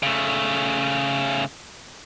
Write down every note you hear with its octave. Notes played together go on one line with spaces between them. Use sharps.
C#3 A3